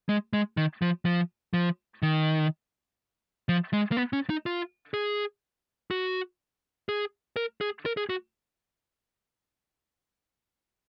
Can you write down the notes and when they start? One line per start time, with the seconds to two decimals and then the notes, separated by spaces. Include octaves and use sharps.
0.09 G#3
0.33 G#3
0.57 D#3
0.82 F3
1.05 F3
1.54 F3
2.03 D#3
3.49 F3
3.73 G#3
3.92 A#3
3.97 B3
4.13 C#4
4.30 D#4
4.46 F4
4.94 G#4
5.91 F#4
6.89 G#4
7.36 A#4
7.61 G#4
7.86 A#4
7.97 G#4
8.09 F#4